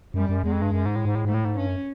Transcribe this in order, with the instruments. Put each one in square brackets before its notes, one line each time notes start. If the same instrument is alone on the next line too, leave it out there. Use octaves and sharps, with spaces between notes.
[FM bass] F#2 [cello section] G3
[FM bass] F#2
[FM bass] E2 [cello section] G#3
[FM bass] F2
G2
F#2
G#2
A2
G#2
A2
[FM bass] G#2 [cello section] A3
[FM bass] A2
G#2
[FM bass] G2 [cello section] C#4
[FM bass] F#2